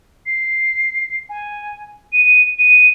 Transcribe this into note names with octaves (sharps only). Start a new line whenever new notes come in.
C7
G#5
D#7
D#7